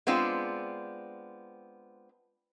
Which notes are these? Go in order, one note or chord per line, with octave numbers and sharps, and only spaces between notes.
G#3 B3 C4 D4 F4